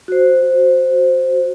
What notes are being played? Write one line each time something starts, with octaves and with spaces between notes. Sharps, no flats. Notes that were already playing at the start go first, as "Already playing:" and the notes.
F#4 C5